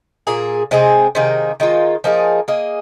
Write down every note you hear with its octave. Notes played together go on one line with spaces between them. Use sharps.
A#2 A#3 G#4
C3 G#3 C4 G#4
C3 D#3 A#3 G#4
D#3 G#3 F4
F3 A#3 D#4 G#4
A#3 G#4 D#5